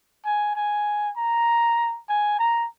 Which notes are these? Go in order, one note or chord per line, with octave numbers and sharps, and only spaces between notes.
G#5
G#5
A#5
G#5
A#5